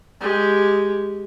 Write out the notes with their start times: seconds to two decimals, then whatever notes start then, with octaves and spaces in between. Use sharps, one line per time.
0.20 G#3 G4